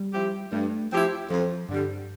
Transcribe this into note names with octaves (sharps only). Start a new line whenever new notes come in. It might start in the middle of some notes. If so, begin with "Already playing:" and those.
Already playing: G3
F3 C4 E4 G4
G2 A3
F3 C4 E4 G4
F2 F3
G2 D3 G3